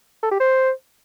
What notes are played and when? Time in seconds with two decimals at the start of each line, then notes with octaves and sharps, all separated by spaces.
0.23 A4
0.31 G4
0.40 C5